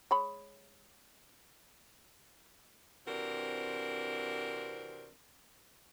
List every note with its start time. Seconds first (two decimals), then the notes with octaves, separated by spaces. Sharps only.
0.11 G#3 C#5 B5
3.07 C3 E3 C4 D4 F#4 A#4